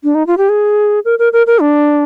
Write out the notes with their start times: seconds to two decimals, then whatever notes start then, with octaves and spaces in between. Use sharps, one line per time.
0.04 D4
0.15 D#4
0.27 F4
0.38 G4
0.49 G#4
1.05 A#4
1.19 A#4
1.33 A#4
1.47 A#4
1.61 D4